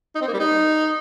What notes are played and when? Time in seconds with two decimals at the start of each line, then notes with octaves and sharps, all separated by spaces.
0.15 D#4
0.21 C4
0.28 A#3
0.34 G3
0.40 D#4